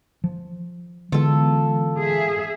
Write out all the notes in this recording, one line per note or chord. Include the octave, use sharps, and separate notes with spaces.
F3
D3 E3 G#3 B3 F4 A4
G#4 E5